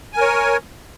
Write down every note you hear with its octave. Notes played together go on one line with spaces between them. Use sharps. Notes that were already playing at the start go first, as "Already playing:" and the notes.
A#4 C#5 G#5